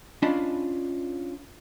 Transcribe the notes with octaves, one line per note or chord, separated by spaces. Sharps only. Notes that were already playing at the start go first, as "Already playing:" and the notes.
C#4 D4 F4 D#5 A5 B5